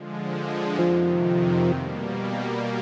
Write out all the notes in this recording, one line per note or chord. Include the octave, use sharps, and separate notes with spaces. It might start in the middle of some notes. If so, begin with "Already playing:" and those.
Already playing: D3 F3 G#3
F2 C3 D#3 F3
B2 G3 A#3